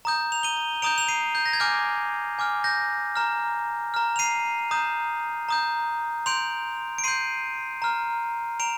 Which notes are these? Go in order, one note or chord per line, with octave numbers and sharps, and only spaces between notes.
A#5 D#6 G6
F7
D#7 G7
A#5 D#6 G6 D7 F7
F7
C7 D#7
G6
A#6
G#6
G#5 D6 F6 G6
G#5 D6 F6
G6 A#6
A#5 F6
A#5 F6
F7
C7 D#7
A#5 D#6 G6
A#5 D#6 G6
C6 G6 D7 F7
D7
C6 G6 C7 D#7
A#5 F6
A#5 D7 F7